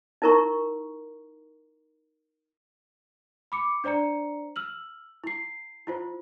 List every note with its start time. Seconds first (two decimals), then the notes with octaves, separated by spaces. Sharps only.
0.22 D#4 E4 A#4 A#5 C#6
3.52 B5 D6 C#7
3.84 D4 C5 D5 A#5 C#7
4.56 E6 F6 F#7
5.24 E4 C7
5.87 E4 F4 C5